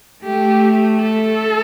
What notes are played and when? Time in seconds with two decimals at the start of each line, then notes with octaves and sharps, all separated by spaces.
0.24 A3 G4
1.00 A4